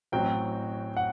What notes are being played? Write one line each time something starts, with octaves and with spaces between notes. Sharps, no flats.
A1 A2 F#3 C4 G5
F#5